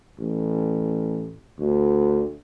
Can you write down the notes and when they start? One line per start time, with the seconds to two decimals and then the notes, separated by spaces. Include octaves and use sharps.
0.19 A1
1.59 D2